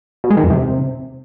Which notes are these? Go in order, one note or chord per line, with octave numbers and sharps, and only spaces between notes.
B2
G#3
D#3
F2
C3